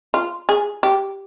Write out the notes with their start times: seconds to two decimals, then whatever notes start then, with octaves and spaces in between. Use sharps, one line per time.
0.14 F4
0.49 G#4
0.83 G4